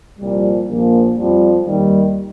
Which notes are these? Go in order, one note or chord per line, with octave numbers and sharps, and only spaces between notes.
C2 A#2 F3 G3
A#1 A#2 F3 A#3
F2 F3 G3
D#2 D#3 G3